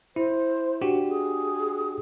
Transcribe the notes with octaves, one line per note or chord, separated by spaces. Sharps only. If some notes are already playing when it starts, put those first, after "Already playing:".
E4 C5
D4 F#4 G4
G#4